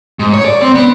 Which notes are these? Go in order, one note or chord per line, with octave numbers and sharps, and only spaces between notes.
G#2
C#5
D5
C4
B3